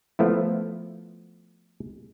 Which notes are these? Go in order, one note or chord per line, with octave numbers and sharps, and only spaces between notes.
F3 A3 B3 E4